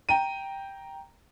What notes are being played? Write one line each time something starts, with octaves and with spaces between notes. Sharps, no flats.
G5 A#5 D#7